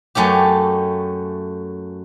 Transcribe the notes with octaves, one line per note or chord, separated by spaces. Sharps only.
F#2 A3 C#4 G4